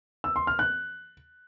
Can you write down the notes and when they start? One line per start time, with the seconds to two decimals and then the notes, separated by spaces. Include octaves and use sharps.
0.24 E6
0.36 C6
0.47 F6
0.59 F#6